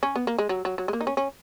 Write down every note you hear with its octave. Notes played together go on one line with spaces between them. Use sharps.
C#4
B3
A#3
G#3
F#3
F#3
F#3
G#3
A#3
D#4
C#4
C#4